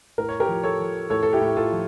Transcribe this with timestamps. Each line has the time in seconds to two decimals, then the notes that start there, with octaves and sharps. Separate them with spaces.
0.18 A2 A#4
0.29 C#5
0.40 G4 A#4
0.48 F3
0.63 A4 C#5
0.79 F3
1.10 A2 A4 C#5
1.23 A4
1.33 E4 G4
1.41 A2
1.56 F4 A4
1.72 F3